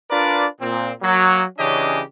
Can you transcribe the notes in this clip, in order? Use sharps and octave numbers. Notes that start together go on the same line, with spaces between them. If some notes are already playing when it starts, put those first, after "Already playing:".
D4 F4 A#4 B4 D5
A#2 C4
F#3 A#3
C#3 E3 C#4 D4 G4 D#5